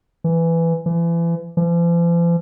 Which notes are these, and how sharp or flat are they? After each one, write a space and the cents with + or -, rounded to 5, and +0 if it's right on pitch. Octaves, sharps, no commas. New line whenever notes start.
E3 +10
E3 +35
F3 -45